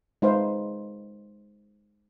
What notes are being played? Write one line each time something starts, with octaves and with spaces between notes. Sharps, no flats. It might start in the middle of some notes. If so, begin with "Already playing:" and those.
G#3 D#4 B4 C5 F5